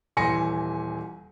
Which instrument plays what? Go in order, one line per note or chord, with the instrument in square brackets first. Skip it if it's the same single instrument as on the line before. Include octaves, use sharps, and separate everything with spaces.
[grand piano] D#1 E3 G#5 C6 A#6 C#7